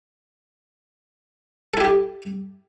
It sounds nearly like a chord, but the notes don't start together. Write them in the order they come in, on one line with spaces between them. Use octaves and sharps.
A4 E4 G4